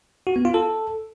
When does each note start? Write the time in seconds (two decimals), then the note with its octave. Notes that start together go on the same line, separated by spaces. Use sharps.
0.27 F#4
0.36 B3
0.45 F4
0.54 A4